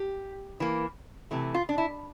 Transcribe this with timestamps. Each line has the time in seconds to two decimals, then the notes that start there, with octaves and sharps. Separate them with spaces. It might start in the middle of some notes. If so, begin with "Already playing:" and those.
Already playing: G4
0.60 E3 A#3
1.31 C3 E3 A3
1.54 F4
1.69 D4
1.78 E4